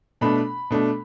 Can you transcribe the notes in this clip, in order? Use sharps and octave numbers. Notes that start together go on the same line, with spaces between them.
B2 A3 D4 B5
B2 A3 D4